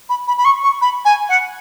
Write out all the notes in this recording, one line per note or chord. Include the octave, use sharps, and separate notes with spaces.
B5
B5
B5
C#6
C#6
B5
G#5
F#5